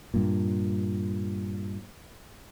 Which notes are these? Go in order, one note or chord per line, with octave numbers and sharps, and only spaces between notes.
G2 A#2